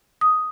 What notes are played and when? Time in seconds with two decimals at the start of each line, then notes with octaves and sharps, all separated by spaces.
0.21 D#6